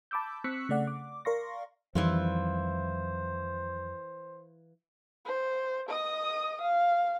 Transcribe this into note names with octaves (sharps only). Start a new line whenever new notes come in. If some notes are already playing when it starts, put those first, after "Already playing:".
A5 B5 D6 E6 G6
C4 C#6 E6 F#6 B6 C#7
C#3 A3 D5 F#5
D6
A#4 D5 F5 C6 C#6 A#6
F2 D#3 E3 G3 E4 F4 C5
C5
D#5 D#6
F5